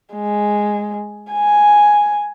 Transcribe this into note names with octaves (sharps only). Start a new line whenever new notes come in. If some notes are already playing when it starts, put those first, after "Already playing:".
G#3
G#5